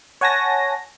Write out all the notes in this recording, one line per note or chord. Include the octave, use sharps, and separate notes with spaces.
C#5 F#5 G#5 A5 A#6